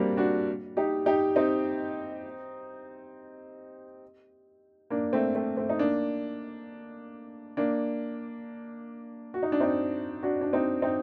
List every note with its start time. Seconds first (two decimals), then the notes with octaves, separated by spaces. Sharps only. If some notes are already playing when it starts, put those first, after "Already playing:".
Already playing: G3 A#3 C4 D4 F#4
0.17 D4 F#4
0.77 D#4 G4
1.06 D#4 G4
1.36 C4 D#4
4.90 A#3 D4
5.13 A3 C4
5.35 A3 C4
5.57 A3 C4
5.69 D#4
5.79 A#3 D4
7.57 A#3 D4
9.34 F#4
9.43 D#4
9.52 D4
9.60 C4 D#4
10.23 D4 F#4
10.41 D4
10.53 C4 D#4
10.82 C4 D#4